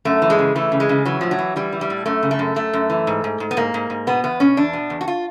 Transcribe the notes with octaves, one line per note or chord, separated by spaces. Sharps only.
F#2 A3
E3
G#3
C#3
E3 A3
C#3
G#3
C#3
E3 F#3
A2 F3
F#3
E3
E3 G3
E3
G3
A2
F#2 A3
C#3
A3
F#2
F#2 A3
F#2
E3
G#2
G#2
G#2
B3
G#2 A#3
G#2
G#2
B2 B3
E2 B3
B2 C#4
E2 D4
B2
E2
F#4
F4